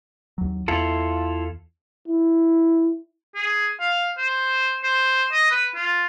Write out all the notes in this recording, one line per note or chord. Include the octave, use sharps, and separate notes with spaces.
D#2 F#3
E2 E4 F4 A4
E4
G#4
F5
C5
C5
D#5
B4
F4